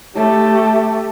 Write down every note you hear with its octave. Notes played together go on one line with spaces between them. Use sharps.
A3 G4